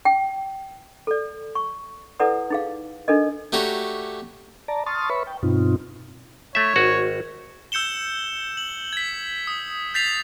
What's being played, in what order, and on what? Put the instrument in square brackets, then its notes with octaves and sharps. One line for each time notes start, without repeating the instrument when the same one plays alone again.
[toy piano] G5
A4 D5
C#6
E4 A4 B4 D5 F#5 D#6
D#4 G#4 F5
D4 D#4 A4 A#4 D#5
[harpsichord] A3 D4 F#4 G4 C#5 A#5
[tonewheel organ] D5 A5 A#5
A5 C6 C#6 D#6 F6 A6
B4 C#5 E5 B5 C#6
G5
G2 B2 C4 D#4 F4
[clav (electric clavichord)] A3 E5 [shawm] C#5
[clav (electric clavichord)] G#1 F#4
[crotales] E6 G6 C#7 E7 G7
F#7
G#6 B6
D#6
G6 A6 B6 C7 F7